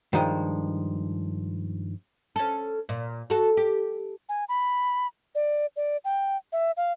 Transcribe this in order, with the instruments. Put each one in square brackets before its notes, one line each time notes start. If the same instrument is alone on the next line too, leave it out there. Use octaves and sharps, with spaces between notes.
[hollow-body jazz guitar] G2 D#3 F3 G#3
[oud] C#4 A4
A#2
F#4 A4
G4
[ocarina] G#5
B5
D5
D5
G5
E5
F5